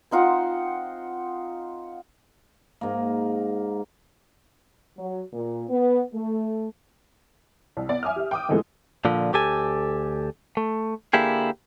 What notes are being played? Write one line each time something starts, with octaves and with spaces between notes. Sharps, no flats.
C4 D#4 F4 F#5
G#2 A#3
F#3
A#2
B3
A3
C2
B3 D5
E5 G#5 D6 D#6 F6
G4 E5
G5 D6 D#6
G#2 D3 E3 F3 G#3 A3
A#2 D3 F3
D2 G4 A4 G#5
A3
D3 A#3 E4 G4 G#4